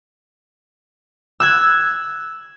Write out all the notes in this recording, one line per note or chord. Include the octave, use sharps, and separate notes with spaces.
E6 F#6 G#6